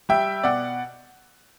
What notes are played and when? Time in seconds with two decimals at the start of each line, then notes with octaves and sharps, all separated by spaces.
0.09 G3 E5 G5
0.43 B2 D5 F#5